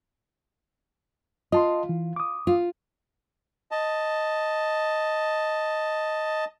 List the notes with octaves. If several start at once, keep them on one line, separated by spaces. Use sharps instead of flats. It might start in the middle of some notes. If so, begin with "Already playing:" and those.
F4 D#5 A5 C6
E3
D6 D#6
F4
D#5 A5